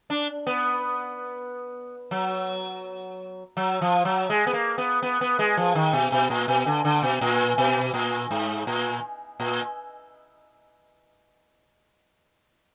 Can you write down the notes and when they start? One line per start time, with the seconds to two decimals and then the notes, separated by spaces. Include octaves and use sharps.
0.10 D4
0.47 B3
2.11 F#3
3.57 F#3
3.81 F3
4.05 F#3
4.30 G#3
4.47 B3
4.53 A#3
4.78 B3
5.02 B3
5.21 B3
5.39 G#3
5.57 F3
5.75 D#3
5.93 B2
6.12 B2
6.30 A#2
6.48 B2
6.66 D3
6.85 D3
7.03 B2
7.21 A#2
7.58 B2
7.94 A#2
8.31 G#2
8.67 A#2
9.40 A#2